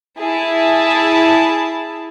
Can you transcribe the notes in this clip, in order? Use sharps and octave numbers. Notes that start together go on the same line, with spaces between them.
E4 G#4 A5